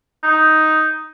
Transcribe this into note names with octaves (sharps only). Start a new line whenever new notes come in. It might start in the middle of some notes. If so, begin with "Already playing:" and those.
D#4